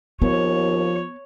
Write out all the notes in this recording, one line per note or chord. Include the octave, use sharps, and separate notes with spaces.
D#2 F3 B3 C#5